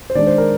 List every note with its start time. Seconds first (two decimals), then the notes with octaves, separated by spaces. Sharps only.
0.10 C5
0.15 D#3 G#3 D4 D5
0.27 C5
0.38 A#4